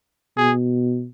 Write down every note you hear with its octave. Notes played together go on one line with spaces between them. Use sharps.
B2 G#4